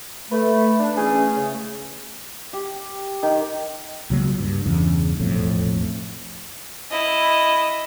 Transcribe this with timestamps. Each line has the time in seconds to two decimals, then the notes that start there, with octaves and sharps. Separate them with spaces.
0.31 A3 B4
0.79 D4
0.97 E3 A3 C#4 G#4
1.36 C#3 A3
2.53 G4
3.23 D#3
4.10 C#2 C#3 F#3 A#3
4.39 G2
4.66 E2 G2 C#3
5.18 E1 A#1 F2 A2
6.90 E4 D#5